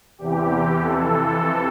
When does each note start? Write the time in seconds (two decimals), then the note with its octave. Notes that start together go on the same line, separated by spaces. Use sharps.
0.18 E2 C3 E3 G4
0.81 F2 C3 E3 A4